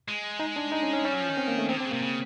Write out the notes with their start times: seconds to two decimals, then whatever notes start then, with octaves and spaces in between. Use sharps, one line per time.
0.08 G#3
0.39 D#4
0.56 D4
0.72 D#4
0.83 C#4
0.93 C#4
1.05 G3 C#4
1.13 F#3
1.20 F3
1.29 D#3
1.37 C4
1.48 A#3
1.58 A3
1.69 D#3 C4
1.77 D3
1.80 C4
1.85 C#3
1.91 C3 A#3
2.02 C#3